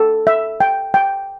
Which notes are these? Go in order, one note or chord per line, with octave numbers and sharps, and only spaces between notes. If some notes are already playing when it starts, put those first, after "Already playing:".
Already playing: A4
E5
G5
G5